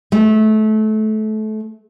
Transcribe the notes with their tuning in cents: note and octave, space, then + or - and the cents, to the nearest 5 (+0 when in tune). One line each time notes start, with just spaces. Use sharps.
A3 -25